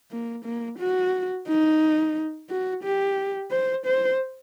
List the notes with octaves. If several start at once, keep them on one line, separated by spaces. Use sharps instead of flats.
A#3
A#3
F#4
D#4
F#4
G4
C5
C5